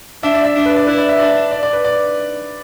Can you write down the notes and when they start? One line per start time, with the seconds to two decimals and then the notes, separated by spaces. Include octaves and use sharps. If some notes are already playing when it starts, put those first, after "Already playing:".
0.23 D4 E5
0.34 D5
0.44 E5
0.55 D4
0.66 B4
0.76 D5
0.87 E4 B4
0.98 D5
1.09 E5
1.19 D4 D5
1.52 D5
1.63 D5
1.73 B4
1.85 D5